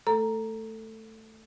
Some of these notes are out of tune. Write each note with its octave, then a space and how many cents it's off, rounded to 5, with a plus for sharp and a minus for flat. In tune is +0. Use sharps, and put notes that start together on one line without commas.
A3 +0 A4 +15 A#5 +0